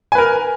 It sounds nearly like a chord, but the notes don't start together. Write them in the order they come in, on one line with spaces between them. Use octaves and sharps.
G#5 B4 A#4